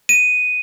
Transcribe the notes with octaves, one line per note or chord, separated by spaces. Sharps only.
D#7